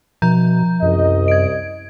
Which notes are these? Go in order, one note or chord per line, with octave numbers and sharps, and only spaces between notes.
B2 F3 A#5 G6
C2 F#2 D#5
G#6 D7